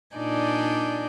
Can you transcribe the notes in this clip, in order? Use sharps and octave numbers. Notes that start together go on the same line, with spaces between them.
A#2 D4 D#4 D5 G#5 G6